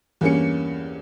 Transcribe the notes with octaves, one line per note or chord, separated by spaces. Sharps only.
E2 G2 A#3 C#4 C#7